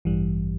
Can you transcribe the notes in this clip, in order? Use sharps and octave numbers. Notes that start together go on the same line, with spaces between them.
A1 G2 E3 G3